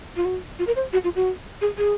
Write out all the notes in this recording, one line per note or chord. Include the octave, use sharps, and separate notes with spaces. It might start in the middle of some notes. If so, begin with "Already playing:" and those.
F4
F#4
F4
A#4
C5
F#4
F4
F#4
G#4
G#4